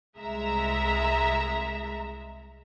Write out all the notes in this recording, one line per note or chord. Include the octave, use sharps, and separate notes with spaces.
C2 G#3 E5 A#5